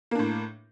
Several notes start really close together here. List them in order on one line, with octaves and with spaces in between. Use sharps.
A#3 D4 A2